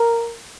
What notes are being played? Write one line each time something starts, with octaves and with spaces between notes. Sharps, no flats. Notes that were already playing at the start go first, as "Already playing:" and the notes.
Already playing: A#4